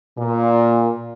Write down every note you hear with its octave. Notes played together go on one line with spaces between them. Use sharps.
A#2